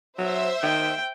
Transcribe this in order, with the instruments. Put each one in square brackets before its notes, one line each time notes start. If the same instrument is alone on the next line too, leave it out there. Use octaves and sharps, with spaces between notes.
[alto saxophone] F#3 [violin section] C5 E5
[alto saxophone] D#3 [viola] G5